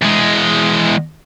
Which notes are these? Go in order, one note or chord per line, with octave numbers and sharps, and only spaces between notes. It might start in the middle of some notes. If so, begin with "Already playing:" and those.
E2 G#3